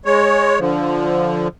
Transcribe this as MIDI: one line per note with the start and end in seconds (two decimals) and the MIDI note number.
0.05 0.59 56
0.05 0.59 73
0.59 1.48 50
0.59 1.48 53